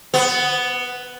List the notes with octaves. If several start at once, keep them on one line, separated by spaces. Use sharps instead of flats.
B3